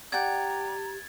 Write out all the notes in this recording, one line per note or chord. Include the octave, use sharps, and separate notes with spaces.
G4 D5 F#5 G5 A#5 G#6 A6